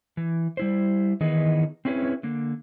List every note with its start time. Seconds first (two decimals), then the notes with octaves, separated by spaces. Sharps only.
0.17 E3
0.57 G3 E4 C5
1.21 D#3 E3 B3 D#4 G#4
1.85 C4 C#4 E4 G#4 B4 C#5
2.23 D3 A#3